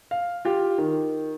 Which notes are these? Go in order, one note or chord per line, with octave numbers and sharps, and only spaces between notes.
F5
F4 G4
D#3